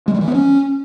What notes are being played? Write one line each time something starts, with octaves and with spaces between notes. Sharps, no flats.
G#3
G3
E3
B3
C#4